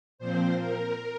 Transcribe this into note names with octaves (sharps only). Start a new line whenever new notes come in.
A#2 F3 C4 C5
A#4